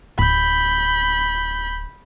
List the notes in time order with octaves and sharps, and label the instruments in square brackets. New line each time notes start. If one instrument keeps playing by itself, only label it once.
[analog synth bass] D1 [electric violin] B5 G6